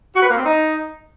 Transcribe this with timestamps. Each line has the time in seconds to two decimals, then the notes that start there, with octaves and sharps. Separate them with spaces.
0.14 F#4
0.22 B4
0.29 A#3
0.37 C4
0.44 D#4